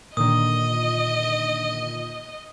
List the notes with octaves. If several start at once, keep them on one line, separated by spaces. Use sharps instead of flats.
A#2 D3 D#3 D#5 D#6